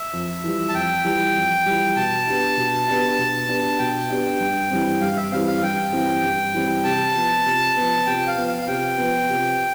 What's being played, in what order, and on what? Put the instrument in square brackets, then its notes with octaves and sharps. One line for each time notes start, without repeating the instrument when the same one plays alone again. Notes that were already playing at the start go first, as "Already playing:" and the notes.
Already playing: [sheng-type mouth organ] E5
[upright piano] F2
E3 G3
[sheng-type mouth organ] A5
[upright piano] F2 [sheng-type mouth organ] G5
[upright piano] E3 G3
F2
E3 G3
[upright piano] B2 [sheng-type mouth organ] A5
[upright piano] B3 D4 G4
B2
B3 D4 G4
B2
B3 D4 G4
[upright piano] B2 [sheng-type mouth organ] G5
[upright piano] B3 D4 G4
G2
E3 G3 C4
[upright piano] G2 [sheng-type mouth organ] F5
[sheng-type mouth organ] E5
[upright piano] E3 G3 C4 [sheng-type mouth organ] F5
[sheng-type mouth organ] F5
[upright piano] G2 [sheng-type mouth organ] G5
[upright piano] E3 G3 C4
G2
E3 G3 C4
[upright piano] C3 [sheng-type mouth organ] A5
[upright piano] F3 B3
C3
F3 B3
[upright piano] C3 [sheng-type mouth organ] G5
[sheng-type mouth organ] F5
[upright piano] F3 B3
[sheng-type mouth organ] F5
F5
[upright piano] C3 [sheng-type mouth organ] G5
[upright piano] F3 B3
C3